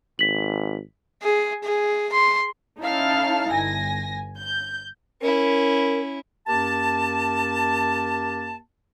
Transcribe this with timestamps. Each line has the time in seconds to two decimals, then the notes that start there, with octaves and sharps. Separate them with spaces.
0.19 G#1 B6 F#7
1.23 G#4
1.64 G#4
2.12 C6
2.80 C#4 D#4 E4 A4 F5 A5
3.52 G1 G#5 A#6
4.38 G6
5.22 C#4 E4 A#4
6.47 F#2 A#3 G4 A#4 A5